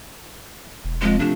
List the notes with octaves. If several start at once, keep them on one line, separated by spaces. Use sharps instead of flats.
E1
F3 G#3 C4
C3 F3 A3 D4